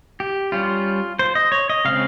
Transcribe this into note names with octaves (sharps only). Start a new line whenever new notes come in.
G4
G3 C#4 F4
C5
D#5
C#5
D#5
C#3 G#3 C4 F5